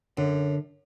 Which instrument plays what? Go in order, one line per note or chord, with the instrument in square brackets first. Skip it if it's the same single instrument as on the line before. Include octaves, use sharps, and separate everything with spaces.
[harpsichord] F#2 [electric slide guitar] D3